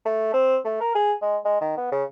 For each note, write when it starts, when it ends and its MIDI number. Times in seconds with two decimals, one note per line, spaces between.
0.05 0.32 57
0.33 0.58 60
0.65 0.77 57
0.81 0.91 70
0.95 1.13 68
1.22 1.38 56
1.45 1.60 56
1.61 1.73 51
1.77 1.90 59
1.92 2.04 49